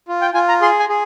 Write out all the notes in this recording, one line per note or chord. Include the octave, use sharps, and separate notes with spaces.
F4
G5
F4 G#5
A#5
G#4 C6
G#5
G#4